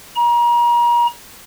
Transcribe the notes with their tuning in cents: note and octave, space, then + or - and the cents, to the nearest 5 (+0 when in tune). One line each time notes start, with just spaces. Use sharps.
A#5 +35